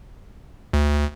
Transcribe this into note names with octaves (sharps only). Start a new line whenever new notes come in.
D2